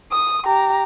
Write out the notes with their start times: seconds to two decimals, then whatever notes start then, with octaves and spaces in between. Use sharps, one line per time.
0.12 D#6
0.45 G4 A#5